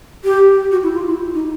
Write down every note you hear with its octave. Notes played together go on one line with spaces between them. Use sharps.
G4
F#4
E4
F4
E4
D#4